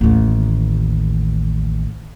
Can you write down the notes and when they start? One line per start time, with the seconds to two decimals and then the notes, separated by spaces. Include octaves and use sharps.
0.01 A1 D#2